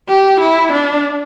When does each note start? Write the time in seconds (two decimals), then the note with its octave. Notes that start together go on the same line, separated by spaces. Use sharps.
0.08 G4
0.40 E4
0.72 D4